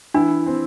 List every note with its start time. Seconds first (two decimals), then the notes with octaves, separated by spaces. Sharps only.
0.14 E3 D4 E4
0.46 C4